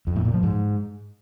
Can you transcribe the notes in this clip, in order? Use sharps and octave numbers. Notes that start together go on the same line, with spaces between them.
F2
A2
A#2
F3
G#2